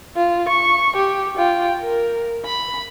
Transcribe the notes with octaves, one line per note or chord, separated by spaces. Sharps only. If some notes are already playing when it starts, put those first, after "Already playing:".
F4
C#6
G4
F4 G5
A#4
B5